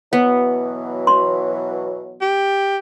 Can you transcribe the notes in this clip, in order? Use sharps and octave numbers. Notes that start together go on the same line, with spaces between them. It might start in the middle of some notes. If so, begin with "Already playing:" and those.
B2 E3 F#3 B3
C6
G4